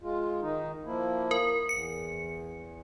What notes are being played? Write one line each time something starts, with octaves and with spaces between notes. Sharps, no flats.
G#3 F4
D#3 D#4
F3 A#3 E4
A#4
E2 C#7